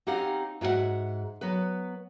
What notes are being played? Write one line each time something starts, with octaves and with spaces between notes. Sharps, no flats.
C4 C#4 D#4 G4 F5 F#5
G#2 F4 F#4 G#4 E5 F#5
F#3 B3 B4